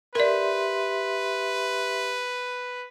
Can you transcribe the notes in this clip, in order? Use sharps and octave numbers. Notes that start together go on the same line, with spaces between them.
G4 A#4 B4 D5 E5 C6